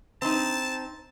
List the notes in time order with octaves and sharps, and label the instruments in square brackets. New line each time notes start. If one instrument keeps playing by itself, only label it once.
[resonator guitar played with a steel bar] C4 D#4 [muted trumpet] A5